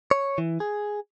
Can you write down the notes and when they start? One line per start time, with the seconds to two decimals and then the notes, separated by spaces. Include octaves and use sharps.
0.11 C#5
0.38 E3
0.60 G#4